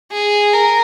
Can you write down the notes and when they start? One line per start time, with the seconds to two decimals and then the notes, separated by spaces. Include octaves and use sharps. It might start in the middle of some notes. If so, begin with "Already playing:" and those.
0.12 G#4
0.53 A#4